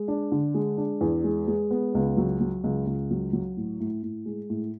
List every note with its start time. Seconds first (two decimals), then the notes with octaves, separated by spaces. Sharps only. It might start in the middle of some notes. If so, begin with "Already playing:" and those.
Already playing: G#3
0.08 D4
0.32 D3
0.54 G#3
0.78 D4
1.01 E2
1.24 G#3
1.48 G#3
1.71 B3
1.95 C#2
2.17 F#3
2.41 F#3
2.64 C#2
2.87 C#2
3.11 F#3
3.33 F#3
3.57 A2
3.80 A2
4.03 A2
4.26 G#3
4.50 A2